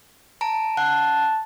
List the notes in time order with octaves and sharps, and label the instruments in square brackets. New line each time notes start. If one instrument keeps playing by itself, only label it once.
[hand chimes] A5 A#5 D7
[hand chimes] F#5 F#6 [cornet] A5